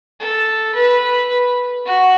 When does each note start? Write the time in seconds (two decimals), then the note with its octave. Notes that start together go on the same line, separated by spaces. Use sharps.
0.20 A4
0.75 B4
1.86 F#4